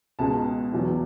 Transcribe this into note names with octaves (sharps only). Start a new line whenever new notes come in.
C#2 B2 G#3 A5
E2 B2 F#3